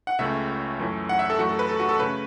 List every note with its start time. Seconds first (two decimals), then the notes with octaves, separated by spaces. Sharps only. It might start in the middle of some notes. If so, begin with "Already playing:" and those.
0.07 F#5
0.19 C#2 C#3 A3 C#4 E5
0.80 F#2 E3 A3 C#4
1.09 F#5
1.19 E5
1.30 A4
1.39 F#2 E3 A3 F#4
1.49 A4
1.59 B4
1.69 A4
1.80 F#4
1.89 A4
1.99 C#3 A3 C#4 B4